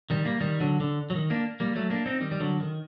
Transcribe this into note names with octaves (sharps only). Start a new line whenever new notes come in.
D#3 G3
G3 A#3
D#3 G3
D3 F#3
D3
F#3
D#3
A#3 D4
G3 A#3
F#3 A3
A#3 D4
C4 D#4
D#3 G3
G3
D3 F#3
D#3